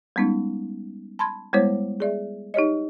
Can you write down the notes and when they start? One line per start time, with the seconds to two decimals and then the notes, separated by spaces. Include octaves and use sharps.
0.16 G3 G#3 B3 C#4 D#4
1.19 A5 B5 C6 G#6
1.53 G3 G#3 B3 E4 C5 C#5
2.00 G#4 D5 E5
2.54 D#4 G4 C#5 D#5